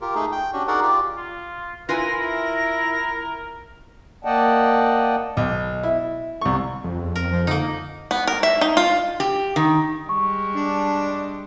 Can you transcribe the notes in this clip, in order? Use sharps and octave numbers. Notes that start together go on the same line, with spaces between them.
F4 G4 A#4
A3 D#4 G#4
G5
C#4 D4 F#4 G4
D#4 F#4 G#4 A#4 D5 F#5
F4 G4 D5
F4
E4 F4 A#4 B4 G#5 A#6
A#3 D5 D#5 F#5 G5 A5
B1
E4
C2 C#6
F2
E2
A#4
F3
D3 A#3 D#4
B3
A#4
E5
D#4
F4
G4
D#3
G3 G#3 C#6
D4